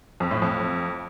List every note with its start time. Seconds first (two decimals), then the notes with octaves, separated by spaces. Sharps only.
0.20 F2
0.31 A2
0.42 F2